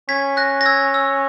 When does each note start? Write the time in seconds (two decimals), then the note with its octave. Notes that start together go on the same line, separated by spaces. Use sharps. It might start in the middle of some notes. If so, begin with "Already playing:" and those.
0.09 C#4 G#6 B6
0.37 F#6 A#6
0.61 A#6
0.66 E6 G#6
0.94 E6